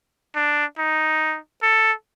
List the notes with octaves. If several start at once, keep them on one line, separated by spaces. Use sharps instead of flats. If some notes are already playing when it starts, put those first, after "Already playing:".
D4
D#4
A4